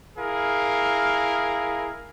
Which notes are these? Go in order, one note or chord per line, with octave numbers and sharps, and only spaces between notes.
E4 G#4 A#4 F5